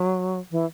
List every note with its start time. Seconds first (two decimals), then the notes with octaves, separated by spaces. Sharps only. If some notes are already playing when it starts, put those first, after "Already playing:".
Already playing: F#3
0.51 E3